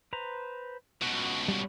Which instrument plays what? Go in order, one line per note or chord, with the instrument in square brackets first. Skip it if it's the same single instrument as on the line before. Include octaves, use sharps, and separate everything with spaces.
[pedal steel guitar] B4 C5 A#5
[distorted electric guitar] C#2 B2 [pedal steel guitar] F#4
[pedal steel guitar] G3 C#5